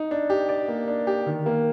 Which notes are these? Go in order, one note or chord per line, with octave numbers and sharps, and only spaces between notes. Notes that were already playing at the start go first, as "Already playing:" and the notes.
Already playing: D#4
D4
G4
D5
A#3
D4
G4
D#3
A#3